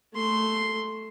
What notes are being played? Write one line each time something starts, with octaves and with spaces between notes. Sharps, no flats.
A3 C6